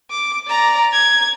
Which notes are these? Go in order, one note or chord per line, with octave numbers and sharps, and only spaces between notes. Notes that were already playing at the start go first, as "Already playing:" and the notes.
D6
D5 A#5
G#6